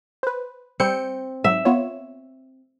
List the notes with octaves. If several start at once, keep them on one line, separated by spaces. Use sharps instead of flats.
B4 C5
G3 C4 G6 C#7
G#2 F#3 E5
B3 F4 C#5